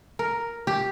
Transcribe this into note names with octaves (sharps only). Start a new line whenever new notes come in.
A#4
G4